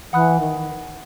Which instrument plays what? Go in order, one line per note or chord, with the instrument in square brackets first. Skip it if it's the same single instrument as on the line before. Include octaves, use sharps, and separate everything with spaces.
[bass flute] E3 [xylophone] F#5 B5 D#6 F#6
[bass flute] D#3